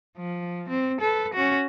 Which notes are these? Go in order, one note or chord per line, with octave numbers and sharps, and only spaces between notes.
F3
C4
A4 B4
C#4 F#4